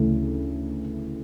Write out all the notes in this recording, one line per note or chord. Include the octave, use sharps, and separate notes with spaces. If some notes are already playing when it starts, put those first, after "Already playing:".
Already playing: D2 C#3 E3 A3